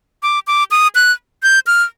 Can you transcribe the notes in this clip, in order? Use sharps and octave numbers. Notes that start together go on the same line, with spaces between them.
D6
D6
D#6
F#6
G6
F6